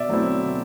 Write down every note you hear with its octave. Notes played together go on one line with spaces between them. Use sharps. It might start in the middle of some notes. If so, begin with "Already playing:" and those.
Already playing: B2 D5 E5
F#3 A3 C4 E4
B2